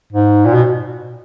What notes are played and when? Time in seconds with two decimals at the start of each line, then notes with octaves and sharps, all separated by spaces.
0.12 G#2
0.46 A#2
0.53 B2